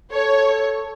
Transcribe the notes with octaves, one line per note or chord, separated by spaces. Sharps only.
A4 C#5